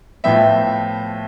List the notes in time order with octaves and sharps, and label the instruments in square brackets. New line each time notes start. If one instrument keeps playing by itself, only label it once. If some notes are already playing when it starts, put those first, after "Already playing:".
[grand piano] A2 F3 B3 E5 G5